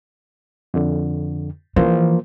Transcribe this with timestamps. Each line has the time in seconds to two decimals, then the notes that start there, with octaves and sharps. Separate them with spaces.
0.74 F2 D3
1.76 E3 F3 A#3 C5